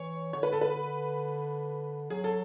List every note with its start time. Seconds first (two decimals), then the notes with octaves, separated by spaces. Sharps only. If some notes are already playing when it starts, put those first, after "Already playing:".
Already playing: E3 C#5
0.33 D3 C#5
0.43 B4
0.53 A4
0.61 B4
2.10 F#3 G#4
2.24 A4